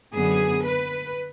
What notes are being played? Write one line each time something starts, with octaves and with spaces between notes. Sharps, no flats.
F#2 D3 F#3 B3 G#4
B4